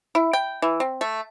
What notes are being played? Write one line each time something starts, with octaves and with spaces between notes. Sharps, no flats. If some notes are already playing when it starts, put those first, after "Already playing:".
E4
G5
E3
C4
A3